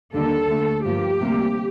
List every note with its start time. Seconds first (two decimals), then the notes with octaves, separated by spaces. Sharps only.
0.13 D#2 D3 G3 A#3 A4
0.49 D2 D3 A3
0.85 G2 F3 A#3 G4
1.21 D2 C3 G3 A#3